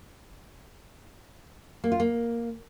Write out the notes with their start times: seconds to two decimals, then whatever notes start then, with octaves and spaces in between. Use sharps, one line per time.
1.84 A#3
1.92 F4
2.00 A#3